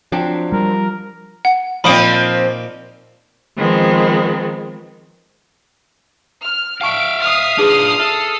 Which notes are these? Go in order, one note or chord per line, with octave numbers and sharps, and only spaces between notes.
F3 F#3 C4 D4
G3 A#4
F#5
A#2 F3 C4 D#4 B5 D#6 D7
D#3 F3 G#3 B3 C4
F6
E5 F5 G5 A5 C#6 D7
D#6 F6 C7
D4 D#4 F4 G#4 B4
A4 E5